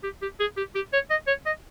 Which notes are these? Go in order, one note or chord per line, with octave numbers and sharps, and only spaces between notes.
G4
G4
G#4
G4
G4
C#5
D#5
C#5
D#5